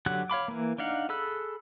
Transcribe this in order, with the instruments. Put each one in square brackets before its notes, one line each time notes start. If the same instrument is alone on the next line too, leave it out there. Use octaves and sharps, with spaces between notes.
[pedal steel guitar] D3 F#3 G4 F#5 F#6
C#5 F5 B5 D6
E3 A#3
D4 D#4 F5 F#5
G#4 A4 B5 E6 F#6